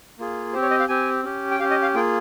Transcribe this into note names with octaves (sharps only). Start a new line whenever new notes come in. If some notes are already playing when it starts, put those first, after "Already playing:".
A#3 F4 G#4
C4 G4 C5
C#5
D#5
F5
C4 G4 G#5
C#4 G4
G5
C#4 G4 F5
D#5
F5
A#3 F4 G#4 G5